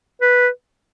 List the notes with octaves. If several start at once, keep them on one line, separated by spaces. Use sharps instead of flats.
B4